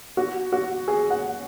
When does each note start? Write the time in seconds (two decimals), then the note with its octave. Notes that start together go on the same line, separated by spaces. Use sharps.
0.17 F#4
0.52 F#4
0.88 G#4
1.10 F#5